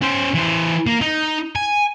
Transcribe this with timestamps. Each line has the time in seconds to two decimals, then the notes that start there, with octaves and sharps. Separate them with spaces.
0.02 C#4 C5
0.35 E3 C5
0.87 A#3
1.01 D#4
1.55 G#5